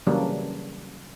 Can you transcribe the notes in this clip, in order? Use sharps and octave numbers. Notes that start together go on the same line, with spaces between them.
C#3 E3 F#3 G3 A#3 D4